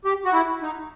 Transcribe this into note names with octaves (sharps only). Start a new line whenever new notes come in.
G4
F#4
E4
D#4